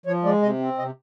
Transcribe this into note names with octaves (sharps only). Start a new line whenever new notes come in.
F3 C#5
G#3 D5
C3 D#5
C4
C3 D#5